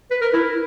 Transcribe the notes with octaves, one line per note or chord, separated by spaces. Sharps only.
B4
A#4
E4